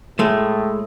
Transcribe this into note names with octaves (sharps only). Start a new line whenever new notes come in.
A2 G#3 A3